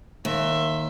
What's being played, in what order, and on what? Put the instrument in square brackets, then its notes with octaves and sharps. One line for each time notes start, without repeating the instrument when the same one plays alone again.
[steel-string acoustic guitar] D#2 [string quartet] E5 C6